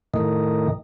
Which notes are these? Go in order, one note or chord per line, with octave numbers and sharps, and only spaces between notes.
A2 D#3